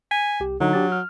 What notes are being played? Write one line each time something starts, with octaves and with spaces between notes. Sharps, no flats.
G#5 B6
C2 G4
D3 F#3 D#4
D4 G4 A6
F6